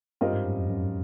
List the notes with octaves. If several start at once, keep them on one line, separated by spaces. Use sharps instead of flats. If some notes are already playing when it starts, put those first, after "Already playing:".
G2 G3 C4 F4 A#4 D#5
G#2
F#2
F2
F#2